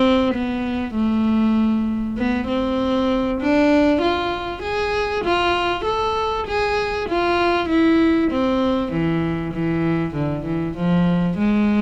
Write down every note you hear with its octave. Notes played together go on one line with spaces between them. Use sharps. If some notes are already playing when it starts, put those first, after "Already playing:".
Already playing: C4
B3
A3
B3
C4
D4
F4
G#4
F4
A4
G#4
F4
E4
C4
E3
E3
D3
E3
F3
G#3